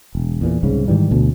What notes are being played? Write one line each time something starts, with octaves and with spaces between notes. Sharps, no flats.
E1
E2 A#2 E3
C2 G#2 C#3
G#2 D#3 E3 G3
D2 B2